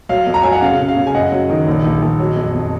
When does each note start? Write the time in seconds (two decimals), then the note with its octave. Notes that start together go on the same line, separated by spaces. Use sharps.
0.09 F#3 F5
0.26 F2
0.34 A#5
0.43 F#3 G#5
0.53 F#5
0.62 C#3 F5
0.79 C#3
0.88 F5
0.96 C#3
1.07 G#5
1.14 F#2 D#5 F#5
1.32 F#3
1.49 D#3
1.67 A#1
1.84 A#1
2.02 A#1
2.19 F#3
2.36 F2
2.54 F2